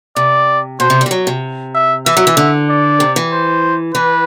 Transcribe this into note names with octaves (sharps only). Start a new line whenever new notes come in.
C3 D5
B2 C5
C3
G3
E3
F#3
C3
E5
E3 E5
F#3
E3
D3
D5
C3
E3
C5
E3 B4